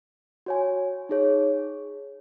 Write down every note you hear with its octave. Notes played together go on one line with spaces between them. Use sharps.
F#4 C#5 G#5
D#4 G#4 C#5